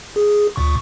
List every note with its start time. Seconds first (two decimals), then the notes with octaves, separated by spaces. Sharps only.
0.16 G#4
0.56 D2 A#2 C#6